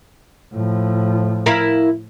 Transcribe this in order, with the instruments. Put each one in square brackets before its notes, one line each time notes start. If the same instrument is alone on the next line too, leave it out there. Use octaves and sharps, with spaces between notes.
[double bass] A2 F3
[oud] E4 A#4 F5